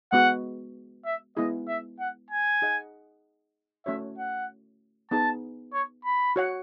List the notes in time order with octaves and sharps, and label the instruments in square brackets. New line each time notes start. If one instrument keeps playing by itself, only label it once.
[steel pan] G#3 B3 F#4 [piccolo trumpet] F#5
[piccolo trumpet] E5
[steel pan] G#3 B3 E4 G#4 [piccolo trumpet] D#5
[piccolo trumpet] E5
F#5
G#5
[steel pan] D#4 G#4 D#5 F#5
[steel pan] A3 C#4 F#4 C#5 [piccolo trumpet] E5
[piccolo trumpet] F#5
[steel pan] B3 D#4 G#4 [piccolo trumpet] A5
[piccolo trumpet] C#5
B5
[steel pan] F#4 C#5 F#5